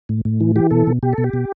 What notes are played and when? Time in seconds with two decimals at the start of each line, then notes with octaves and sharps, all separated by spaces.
0.09 A2
0.25 A2
0.41 E3
0.56 E3 G4
0.71 B2 A4
0.87 B2
1.03 B2 G4
1.13 A4
1.18 B2
1.24 G4
1.33 B2